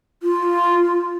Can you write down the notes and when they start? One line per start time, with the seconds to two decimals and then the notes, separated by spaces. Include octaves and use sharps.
0.23 F4